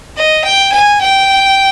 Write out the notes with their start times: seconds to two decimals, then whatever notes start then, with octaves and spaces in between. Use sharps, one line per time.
0.16 D#5
0.44 G5
0.72 G#5
1.01 G5